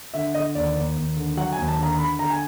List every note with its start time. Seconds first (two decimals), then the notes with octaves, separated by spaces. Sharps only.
0.14 D3 E5
0.35 D3 D#5
0.55 D#2 D5
0.76 D#2
0.97 D#2
1.17 D3
1.37 F#3 F#5
1.52 G#5
1.58 D#2
1.68 A5
1.78 D3 A#5
1.99 D3 B5
2.19 D3 A#5
2.30 G#5